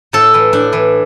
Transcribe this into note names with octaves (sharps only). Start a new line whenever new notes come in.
A2 A4
E3
A2 D4
E3